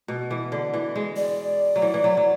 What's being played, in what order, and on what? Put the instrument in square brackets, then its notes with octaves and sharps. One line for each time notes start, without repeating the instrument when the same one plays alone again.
[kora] B2
E3
D3
E3
G#3
[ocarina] D5
[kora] F#3
E3
E3
F#3
F#3